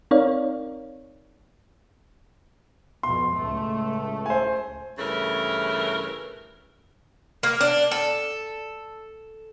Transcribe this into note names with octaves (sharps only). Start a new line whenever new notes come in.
C4 D#4 A#4 C#5 D5 F5
F2 B2 C6
C#2 A2 A3
C5 G#5
G2 C#3 E3 A3 A#4 B4
A#3
D4
A4